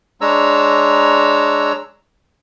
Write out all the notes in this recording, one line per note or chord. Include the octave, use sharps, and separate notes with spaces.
G#3 D4 C#5 A#5 E6